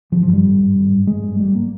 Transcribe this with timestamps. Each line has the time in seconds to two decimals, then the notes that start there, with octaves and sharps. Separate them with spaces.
0.12 G#1 F3
0.23 F3
0.28 G2
0.33 G3
0.44 G#1
0.59 G2
0.76 G#1
0.91 G2
1.07 G#1 G#3
1.23 G2
1.39 G#1 G3
1.55 A#3